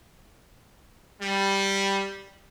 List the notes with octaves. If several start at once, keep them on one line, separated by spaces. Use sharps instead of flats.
G3